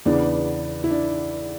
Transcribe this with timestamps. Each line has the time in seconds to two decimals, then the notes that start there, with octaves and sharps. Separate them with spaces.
0.06 E2 C#3 E3 B3 D4
0.84 E4
0.91 D4